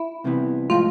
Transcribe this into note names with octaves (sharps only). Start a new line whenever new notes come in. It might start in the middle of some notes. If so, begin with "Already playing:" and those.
Already playing: E4
C2 C3 E3 B3
A2 F3 G#3 F4